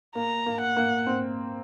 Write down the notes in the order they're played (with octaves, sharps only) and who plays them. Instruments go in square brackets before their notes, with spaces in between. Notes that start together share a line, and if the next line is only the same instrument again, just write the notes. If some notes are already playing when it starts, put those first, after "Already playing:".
[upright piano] A#3 [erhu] A#5
[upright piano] A#3
[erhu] F#5
[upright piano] A#3
C4